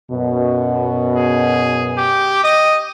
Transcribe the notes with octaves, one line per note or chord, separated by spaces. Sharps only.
F#2 B2
G#4
G4
D#5